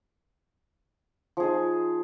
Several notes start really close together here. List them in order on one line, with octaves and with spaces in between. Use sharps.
F3 G#4 D#4